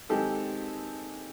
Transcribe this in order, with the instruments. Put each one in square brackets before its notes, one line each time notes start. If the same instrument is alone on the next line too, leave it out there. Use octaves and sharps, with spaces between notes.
[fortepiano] D#3 G#3 C4 G4 A4